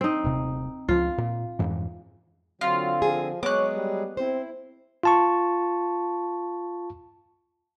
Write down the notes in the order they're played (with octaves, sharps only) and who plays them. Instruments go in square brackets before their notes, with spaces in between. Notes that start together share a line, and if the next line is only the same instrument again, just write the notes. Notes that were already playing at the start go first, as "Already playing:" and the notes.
[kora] C4 D#4
[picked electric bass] D#1 C3
[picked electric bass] C#2 F3 [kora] F4
[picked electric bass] A#2
F2 G#2 E3
[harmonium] D3 C4 [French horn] F#3 [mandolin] F4
[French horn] F3 [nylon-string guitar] G#4
[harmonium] F#3 G#3 G#4 [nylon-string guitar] B3 [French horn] C#5 [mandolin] D6 F#6
[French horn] G3
[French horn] C4 [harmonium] E4 [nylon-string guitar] C5
[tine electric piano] F4 A5 C#6